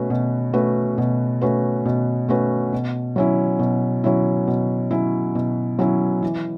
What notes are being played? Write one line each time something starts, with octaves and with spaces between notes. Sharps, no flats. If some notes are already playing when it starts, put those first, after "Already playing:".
Already playing: B2 A3 C#4 F#4 B4
B2
A3 C#4 F#4 B4
B2
A3 C#4 F#4 B4
B2
A3 C#4 F#4 B4
B2
F#3 C#4 E4
B2
F#3 C#4 E4
B2
F#3 C#4 E4
B2
F#3 C#4 E4
E3